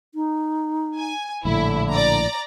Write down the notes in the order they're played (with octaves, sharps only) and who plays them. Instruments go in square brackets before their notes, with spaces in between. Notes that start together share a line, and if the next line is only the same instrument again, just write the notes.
[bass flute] D#4
[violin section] G#5
[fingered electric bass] A#1 A2 [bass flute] D3 [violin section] E4
[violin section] D5 A#5